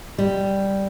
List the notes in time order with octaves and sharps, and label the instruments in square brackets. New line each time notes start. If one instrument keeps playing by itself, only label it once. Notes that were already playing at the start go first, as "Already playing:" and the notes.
[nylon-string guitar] G3